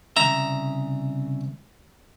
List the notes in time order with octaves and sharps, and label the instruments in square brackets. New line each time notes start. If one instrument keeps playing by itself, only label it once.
[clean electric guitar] C2 C#3 E5 [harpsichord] A#5